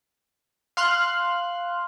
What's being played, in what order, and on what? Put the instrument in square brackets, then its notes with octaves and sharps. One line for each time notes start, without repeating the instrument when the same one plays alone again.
[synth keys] F5 C6 F6 F#6